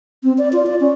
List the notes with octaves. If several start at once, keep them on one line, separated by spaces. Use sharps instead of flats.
C4
D5
F4
D5
C#4